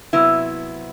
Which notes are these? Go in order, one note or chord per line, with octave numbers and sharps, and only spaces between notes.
C3 F#3 B3 E4